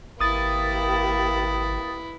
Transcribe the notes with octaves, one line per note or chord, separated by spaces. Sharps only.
G#1 A#3 E4 G4 B4 D#6 A6